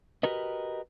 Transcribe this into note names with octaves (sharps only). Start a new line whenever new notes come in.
F#4 G4 A#4 B4 D#5